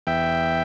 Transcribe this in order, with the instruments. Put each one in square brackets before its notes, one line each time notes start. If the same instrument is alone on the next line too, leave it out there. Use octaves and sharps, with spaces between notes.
[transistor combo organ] E2 E5 G5